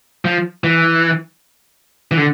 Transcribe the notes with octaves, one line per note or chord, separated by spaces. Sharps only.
F3
E3
E3
D3